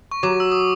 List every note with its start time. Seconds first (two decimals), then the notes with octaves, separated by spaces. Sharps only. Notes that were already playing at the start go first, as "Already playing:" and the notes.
0.11 C#6
0.23 F#3 D6
0.40 E6
0.52 D#6